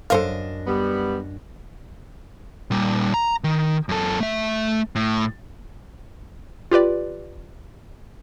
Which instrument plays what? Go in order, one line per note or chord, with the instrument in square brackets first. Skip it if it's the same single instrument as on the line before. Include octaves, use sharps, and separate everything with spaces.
[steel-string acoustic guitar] F#2 D4 D#5 [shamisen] A4 C5 F5
[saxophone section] G3 B3
[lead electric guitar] A#2 G3
A#5
D#3
F#2 A4
A3 E5
A2
[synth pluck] F4 G4 B4 D5